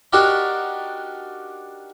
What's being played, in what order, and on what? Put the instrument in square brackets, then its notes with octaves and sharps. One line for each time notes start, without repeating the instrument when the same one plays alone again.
[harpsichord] D4 D#4 F#4 G4 A#4 D5